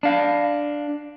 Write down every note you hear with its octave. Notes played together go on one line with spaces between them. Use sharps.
D4 F5